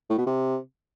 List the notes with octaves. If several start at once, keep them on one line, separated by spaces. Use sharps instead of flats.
A2
B2
C3